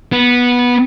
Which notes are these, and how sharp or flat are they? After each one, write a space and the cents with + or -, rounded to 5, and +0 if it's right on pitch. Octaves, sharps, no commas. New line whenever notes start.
B3 -15